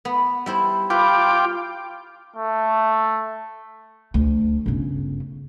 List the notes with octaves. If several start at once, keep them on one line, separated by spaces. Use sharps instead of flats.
B3
G3 E4 C5
F4 B4 G5 D6
A3
D2
G1 C#3